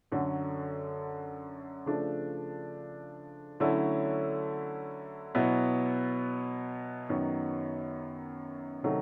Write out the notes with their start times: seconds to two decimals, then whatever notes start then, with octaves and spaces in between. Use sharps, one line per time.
0.12 F#2 D3 F#3
1.86 C#3 F3 A3 D4
3.60 D3 F#3 A3 C#4 E4
5.35 B2 F#3 B3 E4
7.09 F#2 D#3 F#3 B3
8.83 C3 D#3 F#3 A3